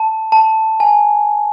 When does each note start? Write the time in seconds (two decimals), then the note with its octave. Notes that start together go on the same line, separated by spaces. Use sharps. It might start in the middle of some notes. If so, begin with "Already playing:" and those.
Already playing: A5
0.32 A5
0.80 G#5